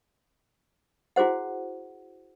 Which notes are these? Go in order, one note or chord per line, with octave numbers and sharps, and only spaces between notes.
E4 F#4 G#4 C5 F#5